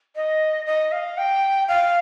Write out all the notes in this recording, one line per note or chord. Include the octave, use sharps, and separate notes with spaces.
D#5
D#5
F5
G5
F5